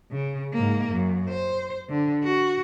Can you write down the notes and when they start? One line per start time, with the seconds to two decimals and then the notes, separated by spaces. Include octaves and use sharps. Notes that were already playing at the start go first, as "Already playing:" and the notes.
0.11 C#3
0.53 G#2 A#3
0.91 F#2
1.29 C5
1.90 D3
2.23 F#4